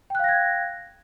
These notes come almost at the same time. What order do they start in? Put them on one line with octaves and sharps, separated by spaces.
G5 F#6 F5 A#6 G#6